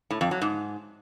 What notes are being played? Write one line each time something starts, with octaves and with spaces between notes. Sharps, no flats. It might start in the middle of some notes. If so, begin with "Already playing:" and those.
A2
F2
F#3
G#2